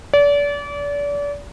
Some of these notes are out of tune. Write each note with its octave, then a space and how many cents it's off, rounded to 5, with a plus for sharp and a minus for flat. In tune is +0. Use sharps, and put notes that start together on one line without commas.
D5 -35